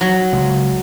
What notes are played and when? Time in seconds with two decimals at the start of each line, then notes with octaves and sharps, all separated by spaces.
0.01 F#3
0.33 C#2